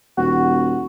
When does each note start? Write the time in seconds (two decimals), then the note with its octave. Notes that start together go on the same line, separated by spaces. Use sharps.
0.17 D#1 F#4